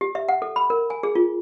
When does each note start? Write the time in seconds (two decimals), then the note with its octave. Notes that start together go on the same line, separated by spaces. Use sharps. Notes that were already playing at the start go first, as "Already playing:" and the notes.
0.01 G4
0.15 E5
0.28 F#5
0.42 A4
0.56 B5
0.70 A#4
0.90 G#5
1.03 G#4
1.15 F4